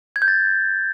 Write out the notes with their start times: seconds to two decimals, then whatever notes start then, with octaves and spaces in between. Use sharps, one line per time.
0.16 G#6
0.22 G6
0.28 A6